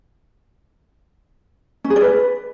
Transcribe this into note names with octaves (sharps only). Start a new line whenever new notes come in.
C#4
G#4
D5
B4